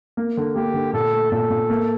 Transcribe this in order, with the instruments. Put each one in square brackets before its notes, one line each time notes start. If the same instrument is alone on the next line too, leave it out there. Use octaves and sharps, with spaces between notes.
[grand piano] A#3
D3
[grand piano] A#3 [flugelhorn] G4
[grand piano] D3
[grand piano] A#2 [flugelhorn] A4
[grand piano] A3
[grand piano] A#2 [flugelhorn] A4
[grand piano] A#2
A#3